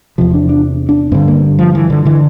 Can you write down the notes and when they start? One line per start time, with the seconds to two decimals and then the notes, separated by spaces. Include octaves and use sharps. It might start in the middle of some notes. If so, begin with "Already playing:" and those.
0.18 E2 C3 F3
0.34 D4
0.49 D4
0.89 D4
1.12 G2 D3 C4
1.28 A#3
1.59 F3
1.75 E3
1.90 D3
2.05 D3 E3